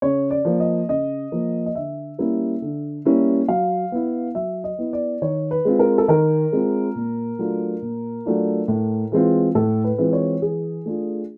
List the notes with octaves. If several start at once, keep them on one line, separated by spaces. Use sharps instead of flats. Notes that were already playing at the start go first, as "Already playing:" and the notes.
C#3 C#5
D5
F3 A#3
D#5
C#3 D#5
F3 A#3
D#5
D3 E5
G3 A#3 C#4 E4
D3
G3 A#3 C#4 E4
F#3 F5
B3 E4
F#3 E5
D#5
B3 E4
D5
D#3 C#5
B4
G#3 C4 F4
A#4
A4
D#3 A#4
G#3 C4 F4
A#2
F#3 A3 D4 F4
A#2
F#3 A3 D4 F4
A2
E3 G#3 C4 F4
A2 A4
B4
E3 G#3 C4 F4
C#5
E3 G#4
A3 D4 F4